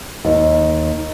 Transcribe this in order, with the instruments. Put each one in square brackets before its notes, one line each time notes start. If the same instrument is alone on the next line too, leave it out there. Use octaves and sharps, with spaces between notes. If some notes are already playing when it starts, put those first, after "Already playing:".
[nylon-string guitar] D#2